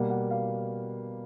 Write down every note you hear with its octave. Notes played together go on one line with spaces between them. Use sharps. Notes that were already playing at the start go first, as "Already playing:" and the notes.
Already playing: B2 G3 A#3 F#5
F#5
F5